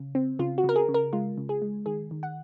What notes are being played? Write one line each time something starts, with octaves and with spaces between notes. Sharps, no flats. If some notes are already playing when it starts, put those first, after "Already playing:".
Already playing: C#3
C4
C#3 F4
F#4
C#3
A#4
G#4
C#3
A#4
G#3 F4
C#3
G#4
G#3
D#3 G#4
D#3
F#5